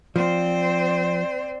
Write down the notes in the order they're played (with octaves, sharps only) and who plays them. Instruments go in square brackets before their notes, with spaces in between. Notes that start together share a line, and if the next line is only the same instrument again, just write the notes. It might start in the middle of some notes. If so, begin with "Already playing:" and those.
[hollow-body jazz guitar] F3 [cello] C4 C5 [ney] D5